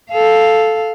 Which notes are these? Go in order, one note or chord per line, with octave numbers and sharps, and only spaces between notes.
A4 F5